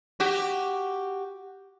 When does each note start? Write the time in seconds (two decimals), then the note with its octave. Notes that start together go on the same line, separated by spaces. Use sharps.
0.20 F#4 G4